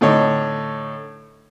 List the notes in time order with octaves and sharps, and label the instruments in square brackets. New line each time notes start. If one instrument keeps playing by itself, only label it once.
[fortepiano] A2 D3 D#4 C#5